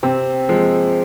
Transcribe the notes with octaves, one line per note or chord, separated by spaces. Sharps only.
C3 C4
F3 G#3